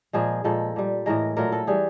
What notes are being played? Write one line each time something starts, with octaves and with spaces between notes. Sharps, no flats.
A#2 F3 G#3 G#4
A#2 F3 G#3 A4
A#2 G3
A2 E3 G#3 A#4
A#2 F#3 A3 A#4
A4
E3 G3 G#4